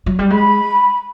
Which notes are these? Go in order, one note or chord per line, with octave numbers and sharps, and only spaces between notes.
F#3
G3
G#3 B5